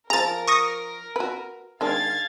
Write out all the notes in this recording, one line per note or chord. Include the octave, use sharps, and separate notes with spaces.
F3 G#4 A#4 A#5 A6
C#6 D#6 A#6
F#4 B4
D#3 G#3 D4 F5 G#6 A6